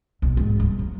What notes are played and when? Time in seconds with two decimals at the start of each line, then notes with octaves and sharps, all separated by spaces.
0.22 B1
0.37 G#2
0.60 G2
0.79 F#3